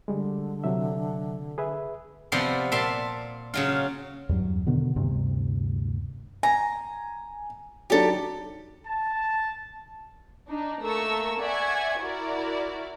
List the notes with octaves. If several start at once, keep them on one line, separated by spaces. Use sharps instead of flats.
D3 G3 G#3
C3 F#3 E5
G#4 B4 E5
C3 F3 B3 D5 C6
A#2 D5 E5 A5 C6
C#3 F#3 F4
E2 G2 F#3
B2 D3 D#3 B3
D2 G2 C3
G#5 A#5
F#3 D4 D#4 G4 A4
A5
D4 D#4
A3 A#3 A4 A#5 C#6 E6
D5 E5 F#5 G#5 C#6 G#6
E4 F#4 A#4 D5